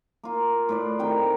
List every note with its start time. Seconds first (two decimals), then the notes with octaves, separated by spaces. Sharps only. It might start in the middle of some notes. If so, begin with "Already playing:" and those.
0.23 A#3 F4
0.69 A2 B4 D5
0.99 C3 D#3 F#5 G5